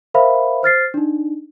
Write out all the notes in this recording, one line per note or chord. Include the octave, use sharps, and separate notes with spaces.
A#4 C5 E5 F5 B5
C5 F6 A6 C7
D4 D#4